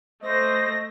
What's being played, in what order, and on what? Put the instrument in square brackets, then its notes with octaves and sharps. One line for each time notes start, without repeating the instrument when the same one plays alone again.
[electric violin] A3 A#6 [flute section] C5 [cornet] D#5